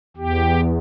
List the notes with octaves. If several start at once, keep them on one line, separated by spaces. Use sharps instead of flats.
E2 G4